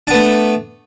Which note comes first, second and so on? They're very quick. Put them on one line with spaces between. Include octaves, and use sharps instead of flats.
D4 B3 A3